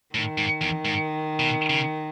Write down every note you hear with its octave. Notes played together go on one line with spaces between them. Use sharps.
A2 D#3
G#2
E2
G#2
B2
C#3